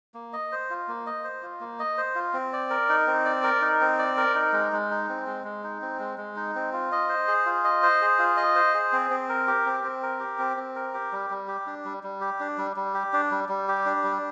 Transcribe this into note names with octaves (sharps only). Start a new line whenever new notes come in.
A#3
D#5
C5
F4
A#3
D#5
C5
F4
A#3
D#5
C5
F4
C4
D5
A#4
D#4
C4
D5
A#4
D#4
C4
D5
A#4
D#4
G#3
G#3
D#4
C4
G#3
G#3
D#4
C4
G#3
G#3
D#4
C4
F4
D#5
C5
G#4
F4
D#5
C5
G#4
F4
D#5
C5
G#4
C4
C4
A#4
G4
C4
C4
A#4
G4
C4
C4
A#4
G4
G3
G3
G4
D4
G3
G3
G4
D4
G3
G3
G4
D4
G3
G3
G4
D4
G3